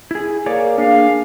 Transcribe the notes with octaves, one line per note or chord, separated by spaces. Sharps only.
E4 G#4
A#3 G#4 C#5 D5
A#3 D4 G#4 F5